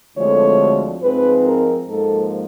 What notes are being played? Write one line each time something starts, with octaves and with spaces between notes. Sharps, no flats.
D2 D3 F3 G#3 C4 C#5
G#2 F3 G#3 C4 B4
A#4
G#2 F3 A#3 A4